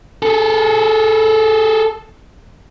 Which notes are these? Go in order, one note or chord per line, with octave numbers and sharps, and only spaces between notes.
G#4 A4